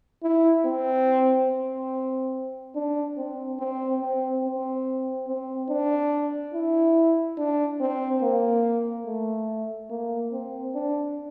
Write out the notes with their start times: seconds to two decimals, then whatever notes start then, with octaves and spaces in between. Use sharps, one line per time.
0.23 E4
0.65 C4
1.49 C4
2.75 D4
3.17 C4
3.60 C4
4.01 C4
4.44 C4
5.28 C4
5.70 D4
6.54 E4
7.38 D4
7.80 C4
8.22 A#3
9.06 A3
9.90 A#3
10.32 C4
10.75 D4